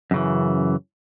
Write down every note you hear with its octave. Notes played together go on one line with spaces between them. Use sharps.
F#2 C#3 E3